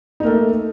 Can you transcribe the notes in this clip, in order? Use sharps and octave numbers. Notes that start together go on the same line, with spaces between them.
A3 A#3 D#4